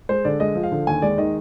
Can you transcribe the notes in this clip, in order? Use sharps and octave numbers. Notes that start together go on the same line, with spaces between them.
G#3 C5
D3 D5
G#3 D#5
F3
F5
D3
D#2 G#5
G#3 D5
D#3 D#5